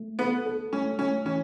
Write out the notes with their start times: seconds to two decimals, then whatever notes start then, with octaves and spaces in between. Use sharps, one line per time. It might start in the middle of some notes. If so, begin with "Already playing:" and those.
Already playing: A3
0.19 B3 A4
0.46 A4
0.73 A3 C#4
0.98 A3 C#4
1.25 E3 C#4